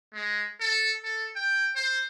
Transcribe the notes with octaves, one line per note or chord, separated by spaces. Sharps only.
G#3
A4
A4
G5
C5